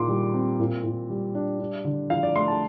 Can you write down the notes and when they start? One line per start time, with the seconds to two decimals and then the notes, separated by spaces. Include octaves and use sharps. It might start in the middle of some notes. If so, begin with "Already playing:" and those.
Already playing: A#2 D#4 C6 D6
0.09 G3
0.34 C4
0.59 A#2
0.84 A#2
1.10 G3
1.35 D4
1.60 D4
1.85 D3
2.10 F3 F5
2.23 D5
2.35 A3 C6
2.48 A5